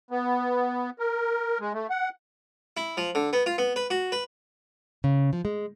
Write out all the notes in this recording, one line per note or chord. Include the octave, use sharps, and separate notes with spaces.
B3
A#4
G#3
A3
F#5
E4
F3
D3
B3
F4
B3
B4
F#4
B4
C#3
F3
G#3